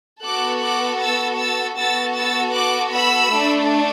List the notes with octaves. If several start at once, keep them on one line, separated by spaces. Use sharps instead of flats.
B3 F#4 A4 D6 F#6
D6 F#6
E6 A6
E6 A6
B3 F#4 A4 E6 A6
E6 A6
D6 F#6
B5 E6
A3 D4 A4